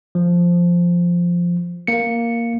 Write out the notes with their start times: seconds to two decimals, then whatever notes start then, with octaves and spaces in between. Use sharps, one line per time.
0.15 F3
1.87 A#3 C#7